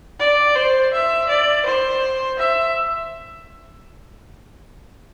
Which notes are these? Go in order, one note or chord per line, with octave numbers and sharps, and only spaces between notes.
D5
C5
E5
D5
C5
E5